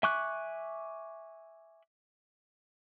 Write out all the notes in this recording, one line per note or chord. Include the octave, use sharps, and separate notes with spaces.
E5 G#5 C#6 D6 F#6